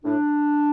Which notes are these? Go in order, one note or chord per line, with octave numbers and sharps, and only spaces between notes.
A2 D4